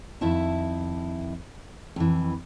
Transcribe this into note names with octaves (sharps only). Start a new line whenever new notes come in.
F2 D#3 E4 E5 A5
F2 E3